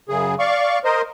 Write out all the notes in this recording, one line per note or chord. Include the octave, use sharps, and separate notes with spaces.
F#2 C#3 G#4
D5 F5 C#6
A#4 C5 D#5